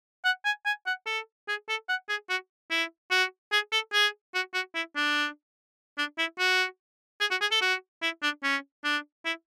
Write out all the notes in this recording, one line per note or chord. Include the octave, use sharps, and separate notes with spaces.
F#5
G#5
G#5
F#5
A4
G#4
A4
F#5
G#4
F#4
E4
F#4
G#4
A4
G#4
F#4
F#4
E4
D4
D4
E4
F#4
G#4
F#4
G#4
A4
F#4
E4
D4
C#4
D4
E4